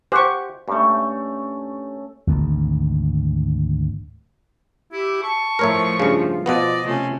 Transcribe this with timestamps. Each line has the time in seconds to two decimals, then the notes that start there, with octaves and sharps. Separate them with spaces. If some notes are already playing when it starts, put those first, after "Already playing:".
0.12 G4 C5 F#5 C#6
0.68 G2 A3 C#4
2.27 G#1 D2 G#2
4.92 E4 G4
5.23 A5 C#6
5.59 A2 F3 A#4 C#5 E5
6.00 G2 C#3 F4
6.46 B2 F3 B3 D5 D#5
6.85 C3 A3 C#4